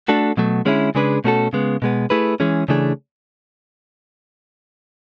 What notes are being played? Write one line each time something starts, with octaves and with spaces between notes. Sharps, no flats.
A3 D4 F#4 A4
B2 F#3 A3
D3 G#3 C#4 E4 G#4
C#3 G#3 D4 G#4 B4
B2 A3 C#4 F#4 A4
C#3 G#3 B3
B2 G#3 B3
A3 E4 G#4 B4
E3 G#3 C#4 G#4
C#3 E3 A3 D4 G#4